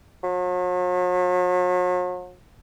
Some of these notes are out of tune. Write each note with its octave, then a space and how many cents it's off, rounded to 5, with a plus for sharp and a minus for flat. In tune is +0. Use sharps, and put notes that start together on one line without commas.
F#3 -40